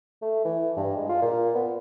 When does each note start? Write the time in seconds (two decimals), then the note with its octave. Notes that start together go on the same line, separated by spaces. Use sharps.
0.22 A3
0.45 E3
0.77 G2
0.97 G#3
1.09 F4
1.22 A#2
1.55 B3